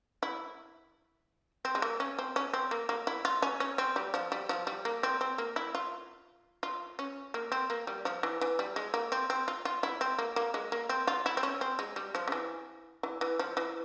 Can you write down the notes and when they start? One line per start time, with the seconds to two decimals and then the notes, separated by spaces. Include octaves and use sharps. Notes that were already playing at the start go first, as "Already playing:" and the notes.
0.23 E4
1.65 C4
1.75 G#3
1.82 A#3
2.00 C#4
2.19 C4
2.36 C#4
2.53 C4
2.71 A#3
2.89 A#3
3.07 E4
3.25 F4
3.42 C#4
3.60 C#4
3.78 C4
3.96 G3
4.14 F3
4.32 G3
4.49 F3
4.67 G3
4.85 A#3
5.03 C4
5.21 C4
5.38 A#3
5.56 E4
5.75 F4
6.63 F4
6.99 C#4
7.34 A#3
7.52 C4
7.70 A#3
7.87 G3
8.05 F3
8.23 E3
8.41 E3
8.59 G3
8.76 G#3
8.94 A#3
9.12 C4
9.30 C4
9.48 F4
9.65 F4
9.83 E4
10.01 C4
10.19 A#3
10.36 A#3
10.54 G#3
10.72 A#3
10.89 C4
11.07 F4
11.26 E4
11.37 C4
11.43 C#4
11.61 C4
11.79 G#3
11.96 G3
12.15 F3
12.28 C#3
12.32 E3
13.03 E3
13.21 E3
13.39 F3
13.57 E3